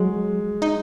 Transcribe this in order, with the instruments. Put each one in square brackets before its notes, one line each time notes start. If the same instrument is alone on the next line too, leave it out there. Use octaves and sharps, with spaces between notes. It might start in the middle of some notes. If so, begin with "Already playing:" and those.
Already playing: [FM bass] F#3 [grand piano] G#3
[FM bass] D#4